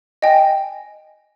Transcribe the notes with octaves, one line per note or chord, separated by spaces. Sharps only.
D#5 G5 G#5